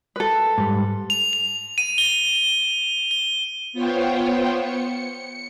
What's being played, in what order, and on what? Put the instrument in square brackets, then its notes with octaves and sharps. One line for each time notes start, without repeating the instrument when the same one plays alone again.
[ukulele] A4 B4
[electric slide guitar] G#2 G3
[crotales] F7
F7
D#7
G7
G7
[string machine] B3 F4 C5 C#5 G5
C#7